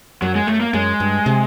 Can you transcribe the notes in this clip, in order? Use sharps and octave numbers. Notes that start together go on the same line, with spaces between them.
F#2 F#3
G#3
F#2 A3
A#3
F#2 G#3
G2
C3